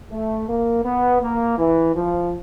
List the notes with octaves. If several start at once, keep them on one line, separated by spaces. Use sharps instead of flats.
A3
A#3
B3
A#3
E3
F3